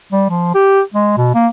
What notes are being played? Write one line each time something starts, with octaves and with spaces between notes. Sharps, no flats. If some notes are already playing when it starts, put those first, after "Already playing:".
G3
F3
G4
G#3
B2
A#3